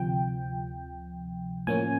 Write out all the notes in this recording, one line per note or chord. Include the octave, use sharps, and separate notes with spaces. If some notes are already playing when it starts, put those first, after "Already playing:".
Already playing: D2 C3 F3 G5
A2 F3 A#3 C#4 G#5